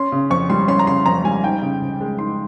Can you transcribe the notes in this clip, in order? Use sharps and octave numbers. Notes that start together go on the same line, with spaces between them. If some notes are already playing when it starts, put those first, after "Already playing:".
Already playing: C#4 C6
C#3
F2 C#6
G3 C6
C#4 C6
A#5
C#3 C6
F2 A#5
G3 G#5
D#4 G5
C#3
C#2
G#3
D#4 C6